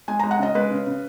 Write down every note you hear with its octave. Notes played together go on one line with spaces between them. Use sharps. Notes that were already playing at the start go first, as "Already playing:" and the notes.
G#3 G#5
G#3 A#5
F#5
C#3 D#5
G#3 B4
C#3
C#3